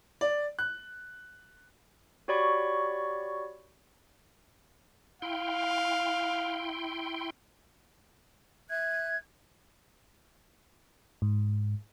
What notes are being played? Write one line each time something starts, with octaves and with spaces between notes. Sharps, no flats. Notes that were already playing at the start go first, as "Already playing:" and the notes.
D5
F#6
F#4 G4 C#5 D5 B5 C#6
E4 F5 G5 C6
E5 F#6 G#6
G#2